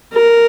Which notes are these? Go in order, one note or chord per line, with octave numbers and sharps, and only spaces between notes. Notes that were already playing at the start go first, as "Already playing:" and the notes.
A#4